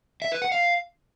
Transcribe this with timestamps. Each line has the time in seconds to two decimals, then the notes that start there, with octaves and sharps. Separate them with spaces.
0.22 E5
0.32 B4
0.42 F#5
0.52 F5